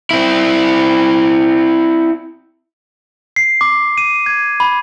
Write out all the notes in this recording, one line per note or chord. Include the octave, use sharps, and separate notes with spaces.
C4 E4
C7
D6
D#7
G#6
B5